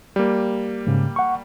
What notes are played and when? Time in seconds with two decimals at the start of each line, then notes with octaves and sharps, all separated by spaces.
0.16 G3 A#3
0.87 G#2 C#3
1.16 F#5 C#6